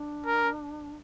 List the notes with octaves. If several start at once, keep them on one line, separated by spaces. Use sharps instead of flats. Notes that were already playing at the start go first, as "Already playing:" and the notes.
Already playing: D4
A#4